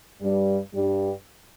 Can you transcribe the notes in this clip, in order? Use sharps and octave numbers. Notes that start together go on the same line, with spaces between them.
G2 G3
G2 G3